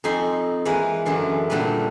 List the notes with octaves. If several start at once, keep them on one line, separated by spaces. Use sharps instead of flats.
F2 C4 D#4 G#5 B5 C6
E3 G#3 A#3 B4
F#2 D3 E3 C6
A#2 D3 G3 A3 B4